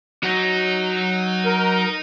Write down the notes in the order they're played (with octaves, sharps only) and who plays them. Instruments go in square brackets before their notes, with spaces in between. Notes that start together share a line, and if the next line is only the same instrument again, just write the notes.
[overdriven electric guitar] F#3 F#4 [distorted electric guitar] D#4
[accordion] A#4